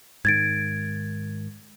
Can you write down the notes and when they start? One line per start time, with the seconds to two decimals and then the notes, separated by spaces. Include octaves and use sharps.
0.25 G#2 D#3 G#6 A6 D7